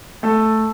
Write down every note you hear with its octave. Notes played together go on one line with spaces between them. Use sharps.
A3 A4